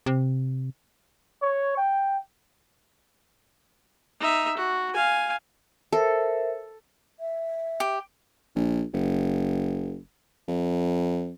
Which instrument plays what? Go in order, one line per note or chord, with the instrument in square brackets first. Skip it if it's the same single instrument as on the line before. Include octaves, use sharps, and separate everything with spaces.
[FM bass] C3
[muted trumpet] C#5
G5
[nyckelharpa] D#4 E5
F#4
F5 G#5
[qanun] A4 [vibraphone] A#4 C5 E5
[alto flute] E5
[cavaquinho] G4
[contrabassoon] A#1
F#1
F2